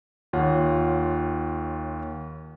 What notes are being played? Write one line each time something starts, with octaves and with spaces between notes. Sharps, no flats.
D#2 F4 C#5 F#5